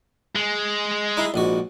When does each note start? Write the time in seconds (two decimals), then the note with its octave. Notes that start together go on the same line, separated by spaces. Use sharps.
0.35 G#3
1.17 D#4 E4
1.34 A#1 G#2 F#4